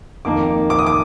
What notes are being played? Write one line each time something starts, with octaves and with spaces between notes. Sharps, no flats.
F2 D#3 A#3 D6
D6
D#6
D6